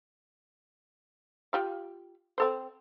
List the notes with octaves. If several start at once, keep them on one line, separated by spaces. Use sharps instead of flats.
F4 G4 F5
C4 A4 C5